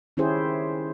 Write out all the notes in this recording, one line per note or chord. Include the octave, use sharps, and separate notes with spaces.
D#3 C#4 E4 G4 G#4 C5